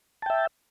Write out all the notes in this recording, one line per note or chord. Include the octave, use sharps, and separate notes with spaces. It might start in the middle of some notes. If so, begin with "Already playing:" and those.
E5 G5 A5